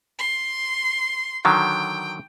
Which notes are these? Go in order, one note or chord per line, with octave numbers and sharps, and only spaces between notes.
C6
D3 D#3 F#3 G5